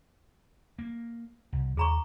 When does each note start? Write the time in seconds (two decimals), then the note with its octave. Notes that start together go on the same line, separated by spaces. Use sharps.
0.79 A#3
1.53 C2
1.77 D#2 G#4 A#5 C#6